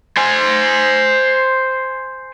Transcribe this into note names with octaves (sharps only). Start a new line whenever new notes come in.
C5 G#5